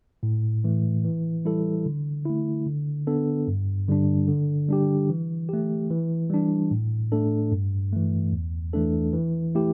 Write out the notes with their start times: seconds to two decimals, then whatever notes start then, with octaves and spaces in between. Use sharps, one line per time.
0.23 A2
0.64 E3 A3
1.04 E3
1.45 G3 E4 A4
1.86 D3
2.25 A3 E4
2.66 D3
3.07 B3 D4 A4
3.48 G2
3.88 D3 G3 D4
4.28 D3
4.69 G3 D4 G4
5.10 E3
5.49 A3 G4
5.91 E3
6.30 G3 D4
6.71 A2
7.12 A3 D4 A4
7.52 G2
7.93 E3 A3
8.32 E2
8.73 E3 A3 D4 A4
9.13 E3
9.55 A3 E4 G4